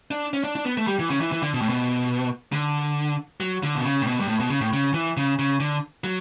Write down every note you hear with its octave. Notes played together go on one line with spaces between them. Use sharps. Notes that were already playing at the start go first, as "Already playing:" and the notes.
D4
C#4
D4
D4
B3
A3
G3
E3
C#3
E3
E3
D3
B2
A2
B2
D3
F#3
D3
B2
C#3
A2
B2
G2
A2
B2
C#3
A2
C#3
E3
C#3
C#3
D3
F#3